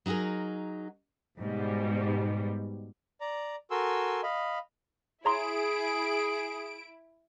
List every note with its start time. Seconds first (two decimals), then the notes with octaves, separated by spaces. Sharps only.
0.06 F#3 D#4 F#4 G#4 A#4
1.40 G#2 B2 G3
3.21 D5 A#5
3.71 F#4 A4 A#4 G#5 C6 E6
4.23 D#5 F5 B5
5.25 E4 G#4 C#5 A#5 C6 D7